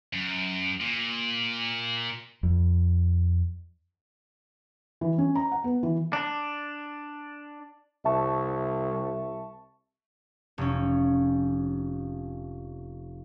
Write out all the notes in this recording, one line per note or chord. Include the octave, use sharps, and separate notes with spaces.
F#2
A#2
F2
E3
C#4
A#5
F#5
B3
E3
D4
C2 E5 A5 C#6
F1 C#4